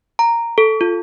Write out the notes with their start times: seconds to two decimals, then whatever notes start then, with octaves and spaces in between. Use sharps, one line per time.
0.19 A#5
0.58 A4
0.81 F4